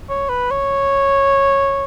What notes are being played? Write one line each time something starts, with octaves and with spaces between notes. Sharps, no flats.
C#5
B4
C#5